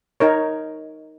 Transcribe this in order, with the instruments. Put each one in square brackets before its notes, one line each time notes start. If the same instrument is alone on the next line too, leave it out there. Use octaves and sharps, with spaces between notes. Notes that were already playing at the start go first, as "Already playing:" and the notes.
[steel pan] D#4 A#4 C#5